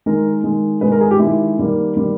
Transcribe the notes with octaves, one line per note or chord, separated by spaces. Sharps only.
D#3 G#3 A#4
D#3 G#3
D#3 G#3 B4
A#4
G#4
G4
D#3 G#3 E4
D#3 G3 A#3
D#3 G3 A#3